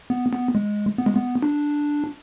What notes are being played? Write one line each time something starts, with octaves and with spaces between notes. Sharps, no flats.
B3
B3
G#3
B3
G#3
B3
D4